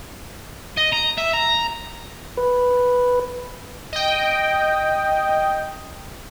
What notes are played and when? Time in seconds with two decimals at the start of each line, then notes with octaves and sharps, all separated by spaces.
0.77 D#5
0.92 A#5
1.18 E5
1.33 A#5
2.37 B4
3.93 D#5 G5